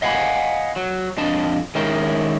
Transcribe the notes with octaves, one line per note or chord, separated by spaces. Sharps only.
D#5 F5 F#5 G#5 A#5 B5
F#3
F2 D4 D#5 A5
D#3 G#3 C#4 E4 A#4 G5